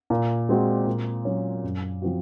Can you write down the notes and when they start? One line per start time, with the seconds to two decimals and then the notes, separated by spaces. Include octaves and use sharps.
0.10 A#2
0.49 G#3 C4 F#4
0.87 A#2
1.25 F#3 C#4
1.64 F#2
2.02 F3 C4 F#4